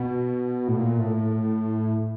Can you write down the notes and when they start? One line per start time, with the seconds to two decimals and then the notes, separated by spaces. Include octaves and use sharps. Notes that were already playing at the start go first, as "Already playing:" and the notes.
Already playing: B2
0.68 A2
0.78 A#2
0.98 A2